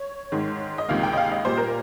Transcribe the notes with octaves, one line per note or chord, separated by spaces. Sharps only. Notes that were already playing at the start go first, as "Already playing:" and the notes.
Already playing: C#5
G#2 D#3 G#3
D#5
C#2 C3 D#3 A#3 F5
G5
D#5
F5
D#5
A#2 G3 A#3 C5
A#4